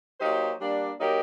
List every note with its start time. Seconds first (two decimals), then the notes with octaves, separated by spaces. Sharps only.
0.19 F#3 A#3 D#4 G4 C5
0.59 G3 A#3 D4
0.98 F#3 A#3 D#4 G4 A#4